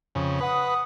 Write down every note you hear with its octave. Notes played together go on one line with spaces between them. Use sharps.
F2 C#3
B4 F#5 D#6